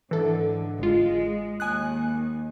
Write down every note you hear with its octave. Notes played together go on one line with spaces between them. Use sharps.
G#2 D3 E3 A4
G1 G#3 F4
D#2 G#5 D#6 F#6